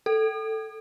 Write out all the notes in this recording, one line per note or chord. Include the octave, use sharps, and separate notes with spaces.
A4